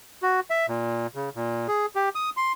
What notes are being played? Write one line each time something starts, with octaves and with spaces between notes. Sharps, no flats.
F#4
E5
A#2
C#3
A#2
G#4
G4
D#6
C6